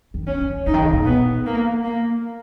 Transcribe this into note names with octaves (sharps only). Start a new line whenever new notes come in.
D#3
C#4
D#3
C#3 D#4
D#3
C#3
B2
B3
A#3
A#3